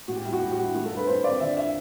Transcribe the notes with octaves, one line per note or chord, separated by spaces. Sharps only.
A2 F#4
G4
G3 E4
F#4
A2 G4
F#4
G3 E4
A3 F#4
A4
G2
B4
G2 C5
C4 D5
D3 E5
E5